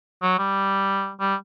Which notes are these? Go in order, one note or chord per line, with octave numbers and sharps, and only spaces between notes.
F#3
G3
G3